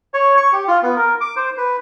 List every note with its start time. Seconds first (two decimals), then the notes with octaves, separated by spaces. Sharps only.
0.14 C#5
0.37 C#6
0.53 G4
0.68 F4
0.83 B3
0.96 A#4
1.21 D6
1.36 C5
1.58 B4